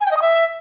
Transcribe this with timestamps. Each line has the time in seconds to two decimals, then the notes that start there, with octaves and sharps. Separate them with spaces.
0.01 G#5
0.06 G5
0.11 D#5
0.17 D#6
0.22 E5